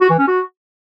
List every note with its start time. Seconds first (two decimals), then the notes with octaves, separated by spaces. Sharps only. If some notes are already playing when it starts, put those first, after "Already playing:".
0.01 F#4
0.10 E3
0.19 C#4
0.28 F#4